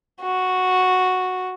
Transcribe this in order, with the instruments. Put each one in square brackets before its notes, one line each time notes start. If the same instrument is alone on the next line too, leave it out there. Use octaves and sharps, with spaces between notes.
[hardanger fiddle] F#4